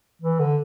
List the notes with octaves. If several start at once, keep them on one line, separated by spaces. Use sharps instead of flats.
E3
D3